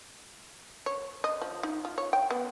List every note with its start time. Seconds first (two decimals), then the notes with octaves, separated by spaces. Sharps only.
0.86 C#5
1.24 D#5
1.42 F3
1.63 D#4
1.85 F4
1.98 C#5
2.13 G5
2.31 B3